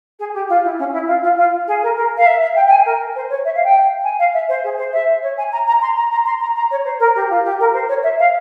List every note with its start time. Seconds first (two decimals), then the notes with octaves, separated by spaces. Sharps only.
0.19 G#4
0.34 G4
0.49 F4
0.64 E4
0.78 C#4
0.93 E4
1.07 F4
1.23 F4
1.37 F4
1.67 G#4
1.82 A#4
1.96 A#4
2.17 F5
2.26 E5
2.41 E5
2.56 G5
2.66 G5
2.71 G#5
2.85 A#4
3.15 C5
3.29 C#5
3.45 E5
3.55 F5
3.64 G5
4.04 G#5
4.19 F5
4.33 E5
4.49 C5
4.64 G#4
4.78 C5
4.93 E5
5.22 C#5
5.37 G#5
5.52 A#5
5.67 A#5
5.81 C6
5.96 A#5
6.11 A#5
6.26 C6
6.40 A#5
6.55 A#5
6.71 C#5
6.85 C5
6.99 A#4
7.15 G4
7.29 F4
7.44 G4
7.60 A#4
7.73 C5
7.88 C#5
8.03 E5
8.19 F5